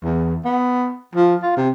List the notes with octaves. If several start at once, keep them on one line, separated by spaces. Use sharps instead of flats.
E2
B3
F3
F4
C3